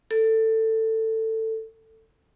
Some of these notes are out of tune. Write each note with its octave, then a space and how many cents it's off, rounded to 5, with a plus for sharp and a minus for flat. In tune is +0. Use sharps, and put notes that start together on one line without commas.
A4 +15